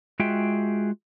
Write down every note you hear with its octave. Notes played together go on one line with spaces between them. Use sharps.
G#3 F4 F#4 G#4 E5 G5